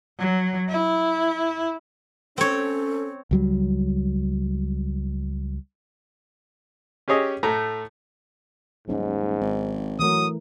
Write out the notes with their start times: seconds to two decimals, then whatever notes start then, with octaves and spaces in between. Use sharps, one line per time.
0.19 F#3
0.69 E4
2.38 C4 C#4 A4 C#5
3.31 C#2 F#3 G3
7.08 C#4 G4 G#4 C#5 D#5
7.43 A2 A3 A#5
8.88 D#1 G#2 F#3 C#4 D#4
9.41 G#1
10.00 E3 F#3 A3 A#4 D#6